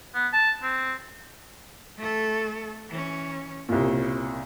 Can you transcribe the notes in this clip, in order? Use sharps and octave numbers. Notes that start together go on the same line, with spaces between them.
B3
A5
C4
A3 A4
E3 C#4
C2 A#2 C#3